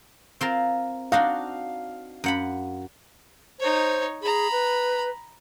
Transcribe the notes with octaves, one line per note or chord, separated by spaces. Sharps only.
C4 F4 A#4
D4 D#4 F#4 F5
F#2 F#5 B5
D#4 C5 C#5
G#4 A#5 B5
B4